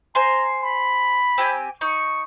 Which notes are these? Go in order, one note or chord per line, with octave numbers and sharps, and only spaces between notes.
C5 G#5 A#5 C6
B5
C4 G4 G#5
D#4 C#6